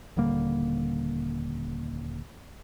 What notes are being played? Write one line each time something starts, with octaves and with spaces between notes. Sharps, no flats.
D#1 D3 G3 A#3